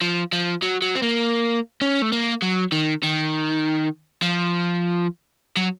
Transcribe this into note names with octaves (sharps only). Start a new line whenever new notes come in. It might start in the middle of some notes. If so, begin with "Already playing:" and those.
F3
F3
F#3
F#3
C4
A#3
C#4
A3
A#3
F#3
D#3
D#3
F3
F#3